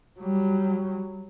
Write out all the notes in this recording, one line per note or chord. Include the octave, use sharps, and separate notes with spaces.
F#3 G3